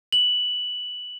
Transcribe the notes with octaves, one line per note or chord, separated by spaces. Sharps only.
F#7